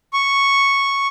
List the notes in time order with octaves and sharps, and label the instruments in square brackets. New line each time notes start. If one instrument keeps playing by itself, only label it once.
[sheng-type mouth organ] C#6